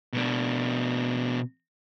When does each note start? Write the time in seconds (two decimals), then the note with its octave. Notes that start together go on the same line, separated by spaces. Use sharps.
0.13 B2 D4